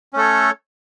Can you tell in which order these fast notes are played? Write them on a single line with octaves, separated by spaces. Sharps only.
C#4 A3 A4 C#5